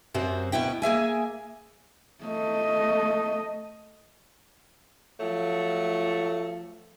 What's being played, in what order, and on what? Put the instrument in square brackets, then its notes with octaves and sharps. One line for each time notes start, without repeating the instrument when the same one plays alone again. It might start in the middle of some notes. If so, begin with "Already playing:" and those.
[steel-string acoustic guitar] F#2 C3 C4 F#4
D2 B2 B3 E4 G5
A#3 G#4 E5 G#5
[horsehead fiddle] A3 D#5
[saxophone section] F3 F#3 A3